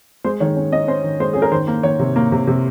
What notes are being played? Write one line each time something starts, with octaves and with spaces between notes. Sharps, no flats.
G#3 C5
D#3 C#5
C#4
C#4 D#5
C#4 C5
D#3
G#3 C5
C#4 G#4
A#4
D#3 C5
A#3
D#3 C#5
C3
A#3
C3
C3